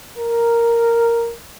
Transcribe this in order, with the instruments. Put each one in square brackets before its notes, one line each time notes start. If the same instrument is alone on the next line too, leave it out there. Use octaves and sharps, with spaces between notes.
[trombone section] A#4